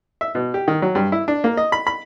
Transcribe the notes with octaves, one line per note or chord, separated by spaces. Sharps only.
E5
B2
G4
D#3
F#3
G2
E4
D4
A#3
D#5
B5
B5